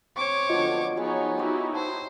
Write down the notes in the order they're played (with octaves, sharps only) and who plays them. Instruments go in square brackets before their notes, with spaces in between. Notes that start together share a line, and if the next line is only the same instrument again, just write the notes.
[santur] C4 [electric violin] C#5 D6 [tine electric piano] C#6
[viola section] D3 F3 B3 [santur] F#3 [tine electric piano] F4 D#5
[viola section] F3 D#4 C#5 [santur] F#3 G#4 [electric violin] B3
[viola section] D#4 E4 F#4 [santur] G4 C#5 D#6
[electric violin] C5 [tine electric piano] A5